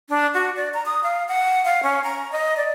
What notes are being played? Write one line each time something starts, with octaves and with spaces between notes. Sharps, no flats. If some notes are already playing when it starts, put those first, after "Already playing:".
D4
F#4
D5
A#5
D#6
F5
F#5
F5
C#4
A#5
D#5
D5